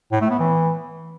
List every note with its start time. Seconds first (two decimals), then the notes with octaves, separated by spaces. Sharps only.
0.12 A2
0.21 A3
0.30 B3
0.39 E3